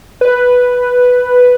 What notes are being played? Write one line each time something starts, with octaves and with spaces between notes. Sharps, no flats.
B4